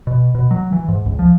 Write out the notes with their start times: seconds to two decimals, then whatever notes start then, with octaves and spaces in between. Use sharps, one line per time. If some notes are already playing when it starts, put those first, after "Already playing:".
0.07 B2
0.35 B2
0.51 F#3
0.72 E3
0.88 G#2
1.06 C#2
1.19 F3